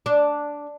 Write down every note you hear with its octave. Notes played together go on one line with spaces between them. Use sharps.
D4